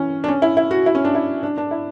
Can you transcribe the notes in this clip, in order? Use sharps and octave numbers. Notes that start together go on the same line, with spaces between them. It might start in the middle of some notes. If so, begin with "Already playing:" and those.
Already playing: E3 C#4
D4
C#4
E4
E4
F#4
E4
C#4
D4
E4
D4
D4
E4